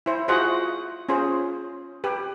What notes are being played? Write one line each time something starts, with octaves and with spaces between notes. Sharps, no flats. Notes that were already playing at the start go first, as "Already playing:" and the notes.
E4 C5
F4 F#4 G#4 C5 D#5 F#5
C#4 F4 G#4 C5
G4 B4